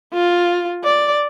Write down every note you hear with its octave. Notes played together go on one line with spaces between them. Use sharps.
F4
D5